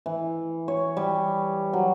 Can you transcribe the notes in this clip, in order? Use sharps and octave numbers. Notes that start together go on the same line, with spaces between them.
E3
C#5
G3
F#3